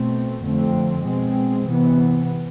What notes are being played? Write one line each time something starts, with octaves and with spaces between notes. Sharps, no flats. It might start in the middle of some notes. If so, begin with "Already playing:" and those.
Already playing: B2 A3 C4
F2 D3 A3 C4
B2 G#3 C4
C3 E3 B3